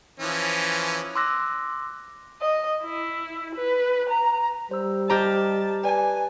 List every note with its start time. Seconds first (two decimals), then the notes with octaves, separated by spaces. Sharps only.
0.20 E3 F3 C#4
1.16 C6 D6 E6 F#6 A#6
2.42 D#5
2.83 E4
3.55 B4
4.09 A#5
4.71 G3 C5 E6
5.10 G4 C5 D#5 A5 A#5 F6
5.84 B4 D5 G#5 A5